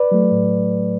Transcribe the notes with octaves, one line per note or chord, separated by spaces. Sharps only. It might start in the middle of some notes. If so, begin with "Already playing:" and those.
Already playing: B4 D5
F#3 A3
A2